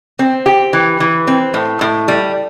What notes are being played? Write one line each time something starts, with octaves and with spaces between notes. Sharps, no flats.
C4
G4
E3
E3
C4
A2
A2
G3